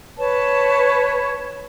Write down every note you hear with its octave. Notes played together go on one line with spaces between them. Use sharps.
B4 C#5 A5